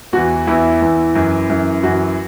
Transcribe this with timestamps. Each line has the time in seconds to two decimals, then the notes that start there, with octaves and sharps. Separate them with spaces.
0.13 E2 E3 F#4
0.47 E2 E3 E4
0.81 E2 E3
1.15 F#2 E3
1.50 F#2 E3
1.83 F#2 E3 F#4